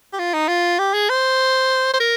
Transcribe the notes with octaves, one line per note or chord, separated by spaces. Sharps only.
G4
F4
D#4
F4
G4
G#4
C5
C5
A#4